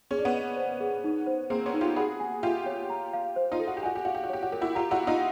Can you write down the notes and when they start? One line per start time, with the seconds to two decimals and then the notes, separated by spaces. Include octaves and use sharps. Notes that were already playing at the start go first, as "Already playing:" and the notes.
0.11 C#4 G#4
0.18 D4
0.25 B3 C#4
0.34 D#5
0.57 C5
0.80 G#4
1.04 D#4
1.27 C5
1.50 A#3 C4 G#4
1.66 B3 C#4
1.74 D#4
1.81 F4 G4
1.96 F#4 G#4 B5
2.20 G#5
2.43 F4 G4 E5
2.66 C#5
2.90 A#5
3.13 F5
3.36 C5
3.52 D#4 F4
3.60 A4
3.67 F#4
3.77 G4
3.83 F#4 G#5
3.95 G4
4.05 F#4 F5
4.15 G4
4.24 F#4
4.29 G4 C#5
4.43 F#4
4.52 G4 A#4
4.61 E4 F#4
4.75 F4 G4 A#5
4.91 E4 F#4
4.99 F#5
5.07 D#4 F4